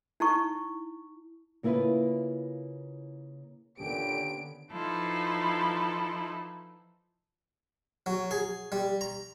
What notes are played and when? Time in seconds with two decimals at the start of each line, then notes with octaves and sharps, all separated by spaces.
0.20 D#4 E4 C#6
1.63 C#3 A#3 E4 F4 B4
3.79 A#2 D3 B3 C#4 G4 D7
4.71 E3 F3 D#4 E4 A4
8.06 F#3
8.31 G#4
8.72 G3
9.01 A#5